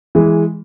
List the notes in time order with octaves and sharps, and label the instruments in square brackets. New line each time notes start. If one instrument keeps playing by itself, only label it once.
[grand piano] E3 G#3